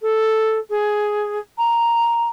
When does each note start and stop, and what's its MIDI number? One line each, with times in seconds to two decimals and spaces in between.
0.01 0.58 69
0.70 1.38 68
1.58 2.28 82